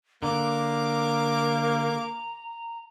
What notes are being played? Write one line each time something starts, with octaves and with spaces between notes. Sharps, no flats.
D3 A#3 A#5 D6